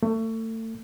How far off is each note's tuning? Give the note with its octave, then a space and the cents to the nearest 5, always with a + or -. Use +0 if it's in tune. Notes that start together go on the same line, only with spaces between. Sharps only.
A3 +30